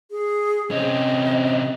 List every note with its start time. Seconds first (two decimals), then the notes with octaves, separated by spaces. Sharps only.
0.11 G#4
0.71 C3 C4 C#4 D#5